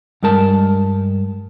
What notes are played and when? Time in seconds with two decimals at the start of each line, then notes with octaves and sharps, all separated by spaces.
0.23 G2 G#3 A#4 A5